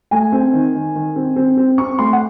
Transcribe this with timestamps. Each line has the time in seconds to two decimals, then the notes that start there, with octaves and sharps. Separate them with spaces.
0.11 A3 G#5
0.32 C4
0.53 D#3
0.75 D#3
0.95 D#3
1.16 C4
1.36 C4
1.57 C4
1.78 C4 C#6
1.99 A3 C6
2.13 F#5